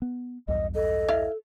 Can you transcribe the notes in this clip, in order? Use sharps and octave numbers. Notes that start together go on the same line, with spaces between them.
B3
B1 E2 G2 D#5
A4 D#5
E4 F5